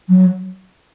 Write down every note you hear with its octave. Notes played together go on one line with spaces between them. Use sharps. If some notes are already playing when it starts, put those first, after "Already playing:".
F#3